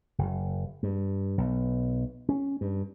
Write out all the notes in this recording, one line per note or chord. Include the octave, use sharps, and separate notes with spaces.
F#1
G2
B1
C#4
G2